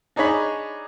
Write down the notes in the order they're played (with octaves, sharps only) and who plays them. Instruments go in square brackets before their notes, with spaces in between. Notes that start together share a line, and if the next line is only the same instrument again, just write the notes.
[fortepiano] D4 D#4 G#4 C#5 B5